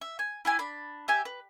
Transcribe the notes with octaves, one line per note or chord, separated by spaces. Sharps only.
E5
G#5
E4 G4 G#5
D4 B5
G4 E5 G#5
B4